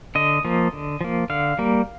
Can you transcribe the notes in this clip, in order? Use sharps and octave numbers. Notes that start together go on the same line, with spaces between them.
D3 D#5
F3 A#3
D3
F3 A#3
D3 F5
G3 A#3